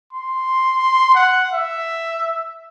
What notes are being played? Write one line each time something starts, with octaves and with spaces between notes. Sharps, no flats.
C6
F#5
E5